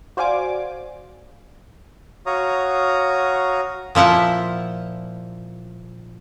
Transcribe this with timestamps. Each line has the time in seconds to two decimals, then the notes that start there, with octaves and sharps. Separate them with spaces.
0.17 F#4 C5 D5 F5 G#5 D6
2.26 F#4 C#5 F5 A#5 D#6
3.95 A#2 F3 E4 F#5